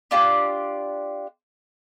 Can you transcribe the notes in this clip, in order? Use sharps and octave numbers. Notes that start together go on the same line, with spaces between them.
D4 F4 G4 D5